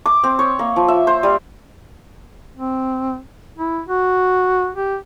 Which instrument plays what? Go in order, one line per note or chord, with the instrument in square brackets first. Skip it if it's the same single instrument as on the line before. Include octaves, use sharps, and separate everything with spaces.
[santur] D6
C4
C#5
A#3
F3
E5
C5
G3
[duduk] C4
E4
F#4
G4